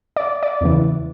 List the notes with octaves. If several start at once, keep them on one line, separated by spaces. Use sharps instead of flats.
D5
D5
E2 C#3 E3